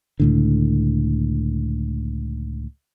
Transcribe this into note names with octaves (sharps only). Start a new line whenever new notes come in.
C#2 A2 D3